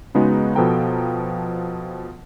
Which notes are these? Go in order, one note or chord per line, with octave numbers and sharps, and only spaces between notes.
C#3 G#3 B3 D#4 F#4
B2 F3 A4 B4 G5 A#5